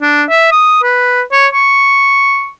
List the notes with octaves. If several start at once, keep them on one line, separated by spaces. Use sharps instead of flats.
D4
E5
D#6
B4
C#5
C#6